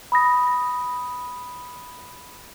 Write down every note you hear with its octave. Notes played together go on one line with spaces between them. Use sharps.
B5 D#6 A#6